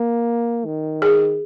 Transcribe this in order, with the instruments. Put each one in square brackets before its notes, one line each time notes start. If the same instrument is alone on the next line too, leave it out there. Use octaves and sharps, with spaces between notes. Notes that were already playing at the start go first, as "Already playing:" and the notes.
Already playing: [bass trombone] A#3
D#3
[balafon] G#4